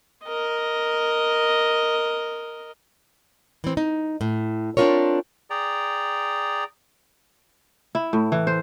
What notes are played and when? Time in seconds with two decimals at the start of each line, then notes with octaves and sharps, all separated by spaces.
0.24 A#4 D#5
3.64 E3 C4
3.77 D#4
4.21 A2
4.77 C4 D4 D#4 F4 A#4 C#5
5.50 G#4 D5 G5 A#5
7.95 E4
8.13 A2
8.32 E3
8.47 C5